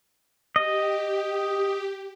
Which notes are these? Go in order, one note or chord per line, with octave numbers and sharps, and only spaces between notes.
G4 D#5